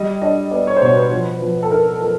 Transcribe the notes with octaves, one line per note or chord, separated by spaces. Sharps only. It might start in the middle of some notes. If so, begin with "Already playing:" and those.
Already playing: G3 D#5
D4 D#5
B3 D5
C#5
C5
B2 C#5
B4
F3
F3
A4
D#4 A#4
F3 A4